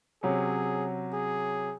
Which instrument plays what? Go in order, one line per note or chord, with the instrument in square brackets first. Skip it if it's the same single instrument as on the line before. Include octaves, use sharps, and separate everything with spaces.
[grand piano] C3 F#3 C#4 [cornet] G#4
[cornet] G#4